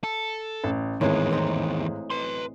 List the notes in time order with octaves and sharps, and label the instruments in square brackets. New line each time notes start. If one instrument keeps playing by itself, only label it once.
[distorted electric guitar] A4
[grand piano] A1
[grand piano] G#1 G#3 [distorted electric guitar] E2 D#3 [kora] A2 B3 G#4
[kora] E3 C4 D#4
[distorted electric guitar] B4 C6